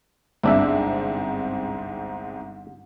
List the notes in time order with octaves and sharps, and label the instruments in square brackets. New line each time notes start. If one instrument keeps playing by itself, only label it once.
[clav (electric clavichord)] G1 D4 E5 [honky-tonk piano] C2 G#2 C4